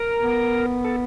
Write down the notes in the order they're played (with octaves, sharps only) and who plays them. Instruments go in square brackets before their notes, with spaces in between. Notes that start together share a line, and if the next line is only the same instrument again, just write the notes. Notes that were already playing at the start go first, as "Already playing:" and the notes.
Already playing: [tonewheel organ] A#4
[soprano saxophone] B3
[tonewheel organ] A4